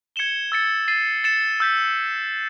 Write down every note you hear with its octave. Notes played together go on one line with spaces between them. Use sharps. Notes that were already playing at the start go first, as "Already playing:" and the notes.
G#6 C#7 E7 G7
E6 A6 C#7
A6 C7 D#7
A6 C#7 E7
E6 G6 B6